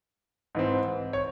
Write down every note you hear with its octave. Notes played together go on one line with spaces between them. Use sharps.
G#2 E3 C4
C#5